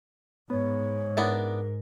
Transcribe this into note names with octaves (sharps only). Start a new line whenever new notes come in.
G#2 B3 C#5
B3 D4 E4 A#4